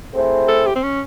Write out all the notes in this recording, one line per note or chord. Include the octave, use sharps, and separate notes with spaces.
A3 C4 E4 G#4 C5
A4
G4
C4
C#4